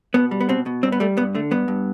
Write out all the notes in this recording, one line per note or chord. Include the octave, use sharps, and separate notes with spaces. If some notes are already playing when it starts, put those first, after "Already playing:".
B2 B3
G3
B3
B2 C4
B2
G2 C4
B3
G3 A3
G2 B3
D3 A3
G2 B3
G2